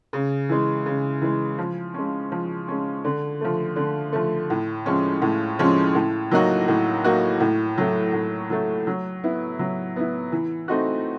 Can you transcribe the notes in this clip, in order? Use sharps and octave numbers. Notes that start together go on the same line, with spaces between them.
C#3
E3 G#3
C#3
E3 G#3
F3
G#3 C#4
F3
G#3 C#4
D3
F3 A3
D3
F3 A3
A2
F3 G#3 C#4
A2
F3 G#3 C#4
A2
F#3 A#3 D#4 F#4
A2
F#3 A#3 D#4 F#4
A2
F#3 A3
A2
F#3 A3
F#3
B3 E4
F#3
B3 E4
E3
A3 C4 D#4 F#4